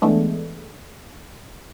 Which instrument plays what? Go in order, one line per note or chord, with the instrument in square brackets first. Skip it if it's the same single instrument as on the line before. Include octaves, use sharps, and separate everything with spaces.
[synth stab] E3 G#3 A3 B3 D4